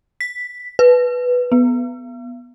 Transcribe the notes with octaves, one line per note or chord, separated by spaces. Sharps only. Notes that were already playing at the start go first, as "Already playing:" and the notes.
B6
B4
B3